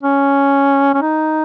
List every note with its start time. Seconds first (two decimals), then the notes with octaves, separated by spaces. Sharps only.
0.03 C#4
0.94 C#4
1.02 D#4